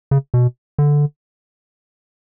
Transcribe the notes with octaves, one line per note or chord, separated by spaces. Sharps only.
C#3
B2
D3